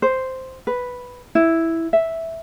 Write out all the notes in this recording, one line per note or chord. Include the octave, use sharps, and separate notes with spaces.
C5
B4
E4
E5